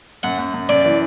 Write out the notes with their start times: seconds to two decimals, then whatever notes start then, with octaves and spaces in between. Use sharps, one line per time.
0.23 F#2 F#5
0.39 F#2
0.54 F#2
0.69 F#2 D5
0.85 E3